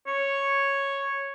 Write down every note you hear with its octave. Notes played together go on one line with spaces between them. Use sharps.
C#5